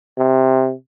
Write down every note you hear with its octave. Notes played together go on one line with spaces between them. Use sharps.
C3